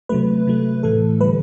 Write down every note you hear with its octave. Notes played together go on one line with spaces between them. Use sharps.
C3 F#3 A3 B4
C3 F#3 A3
A2 E3 A3 A4
D3 G3 B4